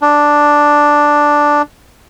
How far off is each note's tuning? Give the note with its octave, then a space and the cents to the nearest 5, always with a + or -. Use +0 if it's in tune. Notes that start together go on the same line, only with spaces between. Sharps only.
D4 +0